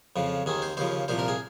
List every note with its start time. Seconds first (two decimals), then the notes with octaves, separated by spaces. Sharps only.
0.16 F2 C#3 F3
0.46 D#2 D#3 G#4
0.62 C5
0.77 D#2 C#3 F3 C5
1.08 C2 A#2 F3 C5
1.19 A#4
1.28 G#4